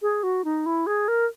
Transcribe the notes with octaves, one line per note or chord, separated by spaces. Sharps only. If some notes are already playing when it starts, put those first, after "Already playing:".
G#4
F#4
D#4
E4
G#4
A#4